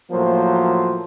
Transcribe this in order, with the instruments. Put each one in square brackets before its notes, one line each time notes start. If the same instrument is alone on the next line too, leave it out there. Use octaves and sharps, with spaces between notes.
[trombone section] A2 F3 F#3 A#3 C5